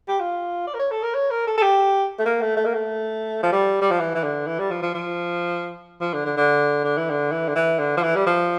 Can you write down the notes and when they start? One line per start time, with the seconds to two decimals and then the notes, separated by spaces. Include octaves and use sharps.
0.08 G4
0.20 F4
0.67 D5
0.74 A#4
0.79 C#5
0.91 A4
1.03 A#4
1.14 C#5
1.30 A#4
1.47 A4
1.58 A4
1.62 G4
2.19 A3
2.25 A#3
2.41 A3
2.57 A3
2.65 A#3
2.74 A3
3.43 F3
3.52 G3
3.81 G3
3.91 F3
4.00 E3
4.15 E3
4.23 D3
4.47 E3
4.59 G3
4.71 F3
4.82 F3
4.94 F3
6.01 F3
6.13 D3
6.25 D3
6.37 D3
6.84 D3
6.97 E3
7.10 D3
7.32 E3
7.48 D3
7.55 E3
7.79 D3
7.97 F3
8.03 E3
8.15 G3
8.27 F3